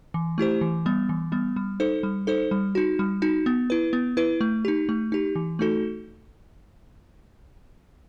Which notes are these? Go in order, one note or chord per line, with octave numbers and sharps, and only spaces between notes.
E3
A3 E4 G4 C5
E3
G3 B3
E3
G3 B3
G3
D#4 A4 C5
G3
D#4 A4 C5
G3
D#4 F#4
G3
D#4 F#4
B3
E4 B4
B3
E4 B4
A3
D#4 G4
A3
D#4 G4
E3
A3 D#4 F#4 A4